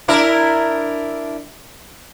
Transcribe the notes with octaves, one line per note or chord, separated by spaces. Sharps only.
D4 E4 A#4